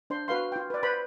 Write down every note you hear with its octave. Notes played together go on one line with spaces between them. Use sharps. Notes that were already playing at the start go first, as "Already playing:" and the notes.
D4 C5 C6
F#4 B4 F5 C6
F4 G5
B4 D5
B4 C5 B5